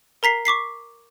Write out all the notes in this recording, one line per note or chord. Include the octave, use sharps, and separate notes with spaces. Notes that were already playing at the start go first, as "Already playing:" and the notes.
A#4 A#5 B6 C7
C#6 D6 B6 C7